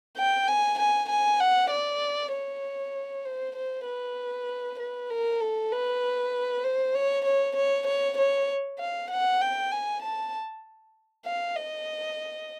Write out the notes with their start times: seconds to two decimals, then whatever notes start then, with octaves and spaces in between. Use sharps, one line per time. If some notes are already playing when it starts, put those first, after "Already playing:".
0.17 G5
0.48 G#5
0.79 G#5
1.10 G#5
1.40 F#5
1.71 D5
2.33 C#5
3.25 C5
3.56 C5
3.87 B4
4.80 B4
5.10 A#4
5.41 A4
5.72 B4
6.64 C5
6.95 C#5
7.25 C#5
7.56 C#5
7.87 C#5
8.18 C#5
8.79 F5
9.11 F#5
9.41 G5
9.72 G#5
10.03 A5
11.26 F5
11.56 D#5